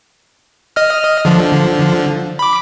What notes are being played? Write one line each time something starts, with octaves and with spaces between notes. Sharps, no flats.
D#5 F6
D3 F3
B5 D6